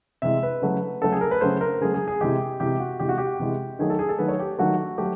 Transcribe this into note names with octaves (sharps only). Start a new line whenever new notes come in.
C3 E3 G#3 E5
B4
C#3 F#3 A3
C#3 F#3 A3 A4
G#4
A#4
B4
C#3 F#3 A3 C5
A#4
C#3 F#3 A3 G#4
G#4
G#4
C3 E3 G#3 G4
C3 E3 G#3 G4
F#4
C3 E3 G#3 G4
F#4
G4
C3 E3 G#3
D#3 F#3 A3 G#4
A4
G#4
A4
D#3 F#3 A3 B4
C#5
G4
D#3 F#3 A3 F#4
F#3 A3 G4